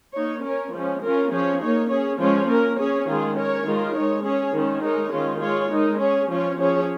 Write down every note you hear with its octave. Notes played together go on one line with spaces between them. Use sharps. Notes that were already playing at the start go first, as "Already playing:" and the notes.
A#3 D#4 C#5
C#4 A#4 C#5
F3 G#3 C#4
C#4 F4 A#4
F3 C#4 G#4 C#5
A#3 D#4 C#5
C#4 G#4 C#5
F3 G#3 C#4 F4 C#5
A#3 C#4 A#4
C#4 G#4 C#5
D#3 G#3 F4 G#4
C#4 A#4 C#5
D#3 G#3 F4 A#4
G#3 D#4 C#5
C#4 G#4 C#5
D#3 G#3 C#4
G#3 D#4 A#4 C#5
D#3 G#3 C#4 F4
G#3 F4 G#4 C#5
G#3 D#4 A#4
C#4 G#4 C#5
F3 C#4 F4 C#5
F3 C#4 G#4 C#5